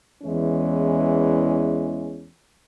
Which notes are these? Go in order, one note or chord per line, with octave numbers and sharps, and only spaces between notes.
E2 E3 G#3 C#4